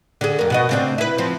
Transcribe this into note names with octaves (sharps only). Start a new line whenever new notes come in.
D3 G#4
F2 A#4
B2 F#4 D#5
C#3 C4 D4
E4 B4
F3 C4